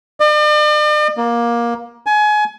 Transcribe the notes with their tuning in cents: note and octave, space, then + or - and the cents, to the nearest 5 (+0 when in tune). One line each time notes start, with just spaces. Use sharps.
D5 +45
A#3 +15
G#5 +25